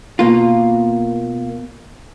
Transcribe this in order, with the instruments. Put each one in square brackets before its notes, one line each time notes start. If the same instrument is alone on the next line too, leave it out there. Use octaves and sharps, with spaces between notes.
[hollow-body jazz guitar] B2 A#3 F4